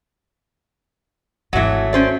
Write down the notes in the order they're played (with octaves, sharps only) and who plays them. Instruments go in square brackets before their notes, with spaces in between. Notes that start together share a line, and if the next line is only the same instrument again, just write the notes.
[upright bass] G#1 D#2 [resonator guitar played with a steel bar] E3 F#5 [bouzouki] F#3 A3
[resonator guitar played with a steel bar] C#4 C5 D5